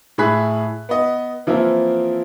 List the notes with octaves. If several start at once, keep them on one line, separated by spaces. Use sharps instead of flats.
A2 E4 G#4 B5 F#6 B6
B3 B4 D#5
E3 F3 A#3 C4 E4 A#4